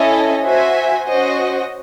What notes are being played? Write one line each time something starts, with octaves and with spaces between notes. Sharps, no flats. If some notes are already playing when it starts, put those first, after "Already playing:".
Already playing: C#4 E4 A4 D#5 G#5
F#4 C5 E5 G#5
C#4 F#4 C5 D#5